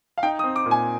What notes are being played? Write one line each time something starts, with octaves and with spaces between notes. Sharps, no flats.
F5
D#4 G5
D#6
C4
D6
A#2
G#5